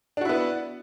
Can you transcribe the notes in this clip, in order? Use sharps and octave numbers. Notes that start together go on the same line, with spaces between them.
B3 D4 E4 F#4